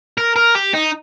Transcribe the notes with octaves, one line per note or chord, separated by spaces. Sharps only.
A#4
A#4
G4
D#4